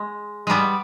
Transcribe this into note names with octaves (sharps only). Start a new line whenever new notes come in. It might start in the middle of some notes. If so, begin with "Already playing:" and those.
Already playing: G#3
G3 G#3 B3